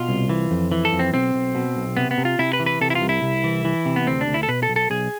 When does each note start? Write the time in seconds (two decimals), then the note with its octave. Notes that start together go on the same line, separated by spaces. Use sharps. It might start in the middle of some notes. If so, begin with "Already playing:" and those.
Already playing: B2 F4
0.09 C2
0.29 E3
0.51 F2
0.72 E3
0.85 A4
0.93 F2
0.99 C4
1.13 B1 C4
1.34 B1
1.55 B2
1.76 B1
1.97 C3 B3
2.11 B3
2.18 C3
2.25 F4
2.39 C3 E4
2.53 B4
2.60 E3
2.66 B4
2.81 C3 A4
2.90 E4
2.95 F4
3.02 C2
3.09 E4
3.22 C2
3.44 E3
3.65 E3
3.86 C3
3.96 B3
4.07 D2 C4
4.21 D4
4.28 D2
4.34 E4
4.43 A4
4.48 B2 B4
4.63 A4
4.69 B1
4.76 A4
4.90 B1 G#4